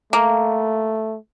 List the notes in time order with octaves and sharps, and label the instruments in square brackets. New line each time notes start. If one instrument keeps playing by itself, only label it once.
[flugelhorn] A3 [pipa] A#3